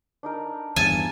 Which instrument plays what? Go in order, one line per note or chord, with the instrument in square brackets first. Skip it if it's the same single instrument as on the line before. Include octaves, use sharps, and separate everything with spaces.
[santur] D4 D#4 A#4
[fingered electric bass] E2 G2 [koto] G#5 A5